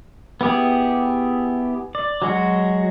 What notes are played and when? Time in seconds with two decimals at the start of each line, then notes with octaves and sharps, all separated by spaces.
0.41 B3 E4 G4 G#4
1.95 D5
2.22 F#3 G#3 F#4